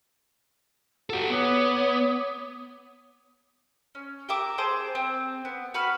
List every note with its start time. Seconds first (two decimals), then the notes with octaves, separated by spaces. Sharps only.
1.10 F#4 G4 A4
1.30 B3 C#5 D6 D#6
3.95 C#4
4.29 G4 A#4 E5 D6
4.58 G#4 C5 A5 D6
4.95 C4
5.45 B3
5.74 F#4 B4 B5 F6